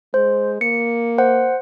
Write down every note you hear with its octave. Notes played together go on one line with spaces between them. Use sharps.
G#3 C5
A#3 C#7
C5 F#5